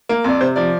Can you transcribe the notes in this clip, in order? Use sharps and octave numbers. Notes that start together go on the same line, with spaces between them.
A#3
F2 D5
C3 C5
F3 D5